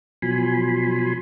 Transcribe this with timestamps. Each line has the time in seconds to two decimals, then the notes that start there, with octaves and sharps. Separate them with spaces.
0.22 B2 F3 F#3 G#5 B5 C6